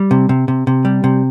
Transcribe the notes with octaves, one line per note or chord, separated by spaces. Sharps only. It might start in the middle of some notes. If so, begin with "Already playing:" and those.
Already playing: G3
C3
C3
C3
C3
G3
C3